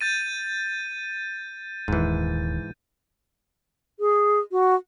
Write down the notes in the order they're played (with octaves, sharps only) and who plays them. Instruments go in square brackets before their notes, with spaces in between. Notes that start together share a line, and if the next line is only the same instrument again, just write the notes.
[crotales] G6 A6 D#7
[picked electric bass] D#1 D#2 [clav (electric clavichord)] G#2 E3
[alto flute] G#4
F#4